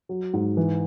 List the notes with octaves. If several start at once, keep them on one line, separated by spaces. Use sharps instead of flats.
F#3
G#2
E3